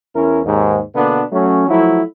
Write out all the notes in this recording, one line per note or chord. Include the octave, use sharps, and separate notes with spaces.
E2 C#4 E4 A#4
D#2 G#2
B2 D3 A#3 B3 D4
F#3 A3 C#4
F3 F#3 A3 E4